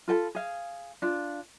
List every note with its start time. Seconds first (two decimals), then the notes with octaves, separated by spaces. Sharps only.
0.08 F4 A4 G5 B5
0.35 G#4 F5
1.02 D4 F4